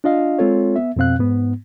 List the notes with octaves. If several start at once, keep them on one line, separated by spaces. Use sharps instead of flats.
D4 F4 D#5 F5
G#3 C4 F4 A4 C#5
B3 E5
F2 B2 C4 F5 F#6
G#2 B3